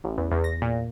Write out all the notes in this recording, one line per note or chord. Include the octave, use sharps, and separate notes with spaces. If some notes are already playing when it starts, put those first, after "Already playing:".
A1
E2
E2
A#6
A#2